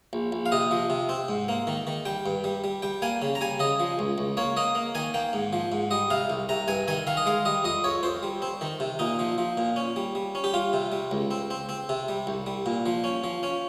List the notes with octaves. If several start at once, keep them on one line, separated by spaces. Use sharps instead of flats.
A#1
A#1
F5
C3 D#5
F3
C3
C4
G#2
A#3
D#3
D#3
G3 G5
G2
G3
G3
G3 G5
A#3 G#5
C#3
A#5
G3 G#5
C#3 D#5
F3
C#2
C#2
A#3 C#5
A#3 D#5
A#3
D#3 G#5
A#3 G5
G#2
F3
G#2
G3 D#5
C3 F5
C2
C3 A#5
G2 G#5
D#3 G#5
D#3 F5
D#5
G#3 F5
G3 D#5
F2 D#5
F2 C#5
F2 C5
G3
C4
D#3
C3
A#2 D#4
F3
F3
A#2
C#4
G3
G3
C#4
G4
G3 F4
C3
G3
C#2
C4
C4
C4
C3
G3
C2
G3
A#2
F3
C#4
F3
C#4